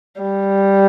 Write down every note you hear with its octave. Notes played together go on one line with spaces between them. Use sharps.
G3